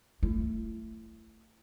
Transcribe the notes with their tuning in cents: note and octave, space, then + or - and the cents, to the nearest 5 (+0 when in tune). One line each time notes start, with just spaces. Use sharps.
A3 +15 E4 +35